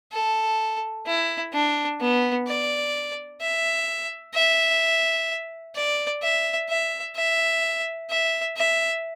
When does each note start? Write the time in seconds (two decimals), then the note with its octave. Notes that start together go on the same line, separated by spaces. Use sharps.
0.13 A4
1.06 E4
1.53 D4
2.00 B3
2.47 D5
3.41 E5
4.34 E5
5.75 D5
6.22 E5
6.69 E5
7.16 E5
8.10 E5
8.57 E5